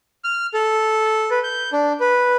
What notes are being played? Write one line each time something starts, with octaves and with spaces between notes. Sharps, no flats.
F6
A4
B4
G6
D4
B4